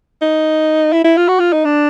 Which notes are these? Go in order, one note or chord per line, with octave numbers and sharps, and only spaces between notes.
D#4
E4
E4
F4
F#4
F4
D#4
D4